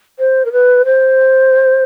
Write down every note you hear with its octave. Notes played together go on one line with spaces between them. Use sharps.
C5
A#4
B4
C5